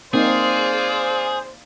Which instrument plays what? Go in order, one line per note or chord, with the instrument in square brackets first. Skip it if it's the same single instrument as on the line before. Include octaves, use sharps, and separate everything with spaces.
[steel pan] A#3 C4 D#4 [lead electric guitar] G#4 [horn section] C5 [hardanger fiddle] D5 F5